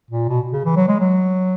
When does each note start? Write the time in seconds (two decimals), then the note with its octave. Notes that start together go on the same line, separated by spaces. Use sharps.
0.10 A#2
0.29 B2
0.52 C#3
0.65 E3
0.76 F#3
0.88 G#3
1.00 F#3